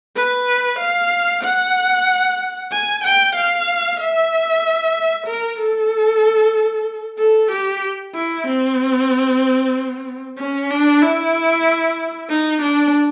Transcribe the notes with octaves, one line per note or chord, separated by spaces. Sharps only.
B4
F5
F#5
G#5
G5
F5
E5
A#4
A4
A4
G4
E4
C4
C#4
D4
E4
D#4
D4